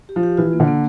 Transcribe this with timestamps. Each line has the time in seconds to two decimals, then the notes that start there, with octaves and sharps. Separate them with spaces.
0.09 G4
0.16 F3
0.23 G4
0.37 E3 F4
0.53 A#3
0.60 D3
0.68 A#3